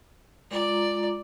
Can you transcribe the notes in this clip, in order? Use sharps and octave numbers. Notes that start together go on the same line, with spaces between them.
G#3 F4 D5 A#5